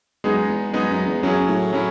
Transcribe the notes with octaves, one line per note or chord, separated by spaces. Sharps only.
F#2 G#3 B3 D#4 G#4
E2
F#2 G#3 B3 D#4 G#4
F#2
E2
F#2 F#3 C#4 E4 G#4
A2
F#3 C#4 E4